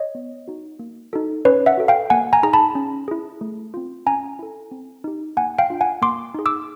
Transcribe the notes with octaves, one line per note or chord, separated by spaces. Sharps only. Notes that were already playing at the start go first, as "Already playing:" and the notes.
Already playing: C#5 D#5
B3
D#4 F#4
A#3
D#4 F#4 A4
C#4 B4 C#5
E5 F#5
F#4 A4
F5 G5
A#3 F#5 G#5
G#5 A#5
D#4 G#4 A#5
A5 B5
C#4
E4 G#4
A3
C4 F4
C#4 G#5 A#5
E4 A4
C4
D#4 G4
A#3 F#5 G#5
F5 G5
D4 F4
F#5 G#5
A#3 C6 D6
D#4 G#4
D6 E6